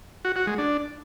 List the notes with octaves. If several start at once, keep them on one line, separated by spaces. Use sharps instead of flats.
F#4
F#4
G#3
D4